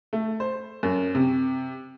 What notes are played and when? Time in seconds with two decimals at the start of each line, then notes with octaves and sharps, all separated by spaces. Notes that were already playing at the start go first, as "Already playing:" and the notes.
0.13 A3
0.40 C5
0.83 F#2
1.15 C3